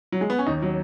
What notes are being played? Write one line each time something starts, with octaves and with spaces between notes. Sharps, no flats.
F#3
G#3
B3
C#4
D#2 D#4
F#3